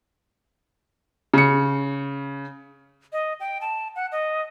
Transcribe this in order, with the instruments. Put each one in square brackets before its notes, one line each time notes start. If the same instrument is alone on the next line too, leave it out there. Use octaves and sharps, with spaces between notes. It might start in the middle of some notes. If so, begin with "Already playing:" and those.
[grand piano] C#3 C#7
[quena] D#5
G5
A5
F#5
D#5